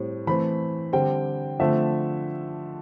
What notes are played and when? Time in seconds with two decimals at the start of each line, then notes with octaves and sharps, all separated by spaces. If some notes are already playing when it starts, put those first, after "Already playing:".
Already playing: A2 G3 C4
0.27 E3 A3 C4 B5
0.93 D3 G3 C4 G5
1.59 D3 F3 A3 C4 E5